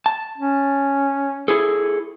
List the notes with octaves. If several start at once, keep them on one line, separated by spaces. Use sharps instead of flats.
A5
C#4
E4 G#4 A4